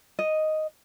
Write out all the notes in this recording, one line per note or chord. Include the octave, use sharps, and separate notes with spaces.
D#5